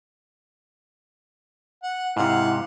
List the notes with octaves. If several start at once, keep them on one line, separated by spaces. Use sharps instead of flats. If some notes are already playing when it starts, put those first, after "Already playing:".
F#5
G#2 C3 E4 F5 F#5